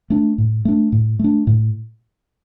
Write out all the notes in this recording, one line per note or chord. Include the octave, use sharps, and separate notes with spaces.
A3 D4
A2
A3 D4
A2
A3 D4
A2